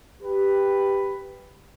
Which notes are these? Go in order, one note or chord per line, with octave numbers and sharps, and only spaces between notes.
G4 B4